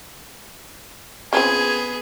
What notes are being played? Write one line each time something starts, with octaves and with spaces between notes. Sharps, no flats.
C#3 F3 B3 C4 G#4 G#5